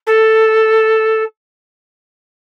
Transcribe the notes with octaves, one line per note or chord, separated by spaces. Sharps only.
A4